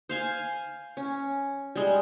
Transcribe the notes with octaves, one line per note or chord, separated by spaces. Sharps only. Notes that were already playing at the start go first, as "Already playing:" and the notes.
C5 F5 G#5
C#4
G3 G#3